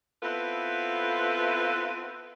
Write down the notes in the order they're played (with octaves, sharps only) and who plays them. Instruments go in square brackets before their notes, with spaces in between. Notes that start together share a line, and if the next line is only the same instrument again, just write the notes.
[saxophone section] B3 C4 E4 F4 A4 B4